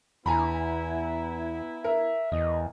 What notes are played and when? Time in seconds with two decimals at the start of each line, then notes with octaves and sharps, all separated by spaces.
0.26 E2 B3 E4 G#5 A#5 B5
1.84 A#4 E5
2.32 E2 D#5